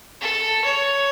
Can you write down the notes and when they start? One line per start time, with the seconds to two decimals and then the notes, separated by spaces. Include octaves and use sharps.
0.21 A4
0.64 C#5